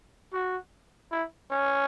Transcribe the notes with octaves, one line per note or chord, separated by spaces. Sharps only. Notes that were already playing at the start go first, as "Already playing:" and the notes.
F#4
E4
C#4